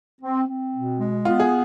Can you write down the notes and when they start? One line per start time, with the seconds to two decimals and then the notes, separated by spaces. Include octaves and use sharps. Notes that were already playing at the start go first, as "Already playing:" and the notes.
0.21 C4
0.47 C4
0.73 B2
0.99 G#3
1.25 B3 F4
1.40 G#4